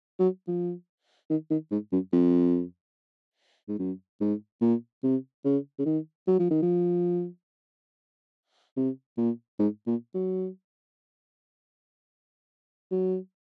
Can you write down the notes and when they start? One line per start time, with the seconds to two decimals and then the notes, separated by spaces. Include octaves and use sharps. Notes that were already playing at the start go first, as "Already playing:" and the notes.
0.20 F#3
0.48 F3
1.30 D#3
1.51 D#3
1.71 G#2
1.92 F#2
2.13 F2
3.69 G#2
3.79 F#2
4.21 G#2
4.62 A#2
5.04 C3
5.45 C#3
5.79 C#3
5.86 D#3
6.28 F#3
6.39 F3
6.51 D#3
6.63 F3
8.77 C3
9.18 A#2
9.59 G#2
9.87 A#2
10.15 F#3
12.91 F#3